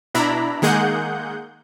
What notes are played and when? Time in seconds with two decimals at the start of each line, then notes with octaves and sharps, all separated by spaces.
0.15 B2 D4 E4 A#5 B5
0.62 D#3 G#3 A#3 G#4 F#5 G6